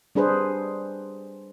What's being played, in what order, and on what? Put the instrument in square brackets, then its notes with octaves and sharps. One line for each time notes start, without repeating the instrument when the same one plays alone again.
[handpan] G3 D4 G#4 B4 C5